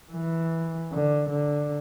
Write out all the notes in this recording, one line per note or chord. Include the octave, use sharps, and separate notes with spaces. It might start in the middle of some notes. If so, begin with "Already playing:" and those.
E3
D3
D3